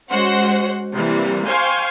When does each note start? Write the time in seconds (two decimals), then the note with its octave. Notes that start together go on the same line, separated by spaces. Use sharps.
0.10 G#3 C#4 F#4 C5 F#5
0.94 C3 E3 G3 A#3
1.45 C5 F5 G5 G#5 C6 C#6